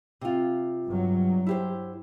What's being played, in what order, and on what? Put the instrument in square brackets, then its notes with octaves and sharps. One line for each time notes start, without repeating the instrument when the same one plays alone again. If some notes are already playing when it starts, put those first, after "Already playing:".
[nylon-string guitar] C3 F4
[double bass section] G2 F#3
[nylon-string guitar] E4 G4 C5